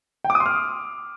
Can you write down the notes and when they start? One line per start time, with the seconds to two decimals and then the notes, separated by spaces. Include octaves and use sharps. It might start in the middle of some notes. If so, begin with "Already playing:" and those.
0.24 G5
0.30 D6
0.35 D#6
0.40 C6
0.46 F6